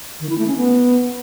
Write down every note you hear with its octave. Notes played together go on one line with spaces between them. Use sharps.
D#3
E4
A3
C#4
B3